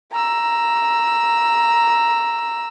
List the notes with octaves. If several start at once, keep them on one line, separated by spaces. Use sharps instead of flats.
A#5 E6